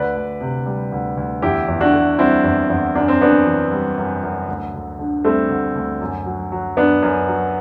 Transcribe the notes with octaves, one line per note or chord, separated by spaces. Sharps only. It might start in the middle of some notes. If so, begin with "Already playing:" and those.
Already playing: D2 B4 D5
D2
C3
G3
D2
D2
E2 E4 G4
E2
D4 F#4
D3
G3 C4 E4
E2
E2
F#2 D4
C4
F#2 B3 D4
E3
G3
F#2
F#2
D2
D2
D3
G3 A3 C4
D2
D2
F#2
F#3
F#3
F#2 B3 D4
F#2
F#3